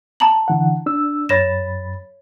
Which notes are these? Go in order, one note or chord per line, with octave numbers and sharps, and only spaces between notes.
A5 A#5 F#7
D3 E3 F#5
D4 E6
F#2 C#5 B5 A6 A#6 E7